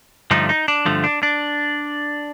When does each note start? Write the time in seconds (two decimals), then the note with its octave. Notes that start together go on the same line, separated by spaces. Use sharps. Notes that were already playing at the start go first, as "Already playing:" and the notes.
0.31 G2 D3 F3 A3 D#4
0.49 D#4
0.68 D4
0.85 G2 D3 F3 A3
1.04 D4
1.23 D4